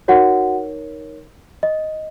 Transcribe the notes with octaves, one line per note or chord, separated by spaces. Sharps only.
D#4 F#4 A#4 C#5 F#5
D#5